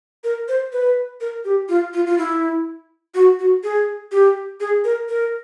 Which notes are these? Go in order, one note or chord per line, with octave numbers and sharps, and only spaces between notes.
A#4
C5
B4
A#4
G4
F4
F4
F4
E4
F#4
F#4
G#4
G4
G#4
A#4
A#4